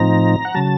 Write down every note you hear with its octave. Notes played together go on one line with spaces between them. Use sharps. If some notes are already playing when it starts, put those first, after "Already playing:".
Already playing: A2 F3 C4 D#4 A#5
F#5
C#3 F#3 A5